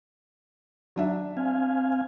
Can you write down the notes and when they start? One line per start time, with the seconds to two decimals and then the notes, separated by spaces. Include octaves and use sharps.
0.96 F#3 D4 E5
1.37 C4 F5 G#5